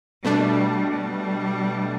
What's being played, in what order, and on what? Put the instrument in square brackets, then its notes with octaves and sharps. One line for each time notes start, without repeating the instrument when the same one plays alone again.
[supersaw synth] B2 A3 D4 [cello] G3
[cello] G3